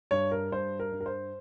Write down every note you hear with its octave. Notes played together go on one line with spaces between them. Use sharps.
G2 C#5
A#4
G2 C5
A#4
G2
A#4
C5